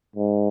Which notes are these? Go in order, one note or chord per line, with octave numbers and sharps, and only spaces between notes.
G#2